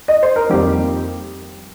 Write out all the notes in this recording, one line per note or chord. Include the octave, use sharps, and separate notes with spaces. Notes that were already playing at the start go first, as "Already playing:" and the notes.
D#5
C5
A#4
F2 D#3 G3 A#3 G4